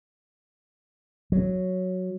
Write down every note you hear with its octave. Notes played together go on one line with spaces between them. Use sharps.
F#3